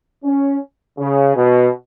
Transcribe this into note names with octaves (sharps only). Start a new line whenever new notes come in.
C#4
C#3
B2